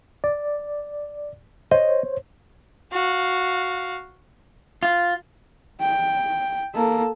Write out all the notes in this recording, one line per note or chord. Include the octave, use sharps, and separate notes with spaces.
D5
C5 C#5 D#5
F#4 F5
F4
G5
A#3 A4